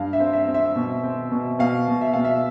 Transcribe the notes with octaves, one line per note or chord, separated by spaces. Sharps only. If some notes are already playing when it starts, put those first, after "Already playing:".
Already playing: G2 F5
E5
C4
E5
C4
E5
B2
C4
B2
B2 F5
B2
E5
B2 F5
E5